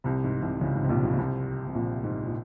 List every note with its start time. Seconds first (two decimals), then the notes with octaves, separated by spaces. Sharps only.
0.04 C2 C3
0.24 G#2
0.42 C2 C3
0.61 C#2 C#3
0.75 G#2
0.84 C3
0.89 A#1 A#2
1.04 C#2 C#3
1.12 A#2
1.18 C2 C3
1.67 C3
1.74 A#1 A#2
2.04 G#2
2.27 A#2